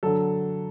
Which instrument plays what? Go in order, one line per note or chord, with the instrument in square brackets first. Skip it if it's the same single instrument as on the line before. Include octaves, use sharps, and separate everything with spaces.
[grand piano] D3 F#3 A4